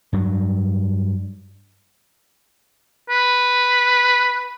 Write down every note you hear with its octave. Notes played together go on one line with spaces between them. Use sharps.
G2 F#3
B4